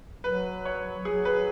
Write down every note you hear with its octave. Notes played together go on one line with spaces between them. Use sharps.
F#3 B4
C#5
F#3 G#4
B4